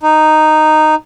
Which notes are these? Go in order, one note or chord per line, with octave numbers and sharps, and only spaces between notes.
D#4